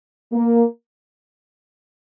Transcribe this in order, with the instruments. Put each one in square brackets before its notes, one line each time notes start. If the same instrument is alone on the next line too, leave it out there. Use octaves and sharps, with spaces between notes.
[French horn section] A#3